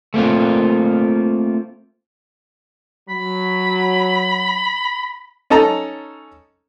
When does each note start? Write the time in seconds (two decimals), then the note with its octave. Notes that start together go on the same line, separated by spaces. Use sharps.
0.14 A3 A#3 C4 F4
3.09 F#3 B5
5.50 C#4 D#4 A4 A5 A#5